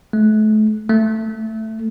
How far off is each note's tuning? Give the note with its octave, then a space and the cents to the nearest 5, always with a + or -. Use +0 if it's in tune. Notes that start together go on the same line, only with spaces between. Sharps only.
A3 -35
A3 +10